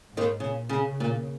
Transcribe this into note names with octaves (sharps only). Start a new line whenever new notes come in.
G#2
D#2 D#3
A#2 C#3
C#3
C#3
A#2